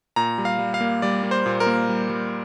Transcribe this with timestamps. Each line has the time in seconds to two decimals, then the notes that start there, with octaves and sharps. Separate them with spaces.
0.16 A#2 A#5
0.38 G3
0.45 F5
0.59 G3
0.74 F5
0.81 A#3
1.02 G3 D5
1.23 A#3
1.31 C5
1.46 A#2
1.60 A#4
1.67 A#3
1.89 G3
2.10 G3